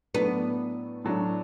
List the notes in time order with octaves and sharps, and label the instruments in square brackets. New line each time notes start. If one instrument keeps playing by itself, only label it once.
[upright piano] A2 F#3 A3 D4 [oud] B3
[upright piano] A2 F#3 A3 D4